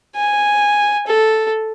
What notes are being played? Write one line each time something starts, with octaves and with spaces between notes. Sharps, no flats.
G#5
A4